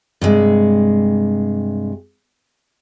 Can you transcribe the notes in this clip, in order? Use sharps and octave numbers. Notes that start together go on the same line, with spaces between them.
G2 C3 G#3